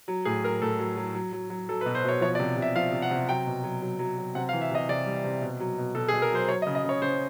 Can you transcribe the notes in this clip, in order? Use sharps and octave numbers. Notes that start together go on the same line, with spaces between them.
F#3
A2 G#4
F#3 A#4
A2 A4
F#3
F#3
F#3
F#3
F#3
F#3 A4
B4
B2
C5
B2 C#5
F3 C#5
D5
C3
C3
E5
F3 F5
C3
F#5
C3
F#3 G5
B2
F#3
F#3
F#3
F#3
C3 F#5
F5
E3
E5
C3 D#5
C3 D5
G3
C3
B2
F#3
B2
B2 A4
G#4
B2
A#4
F#3 C5
F#3 C#5
D#5
C#3
D#5
C#3 C#5
C#3 C5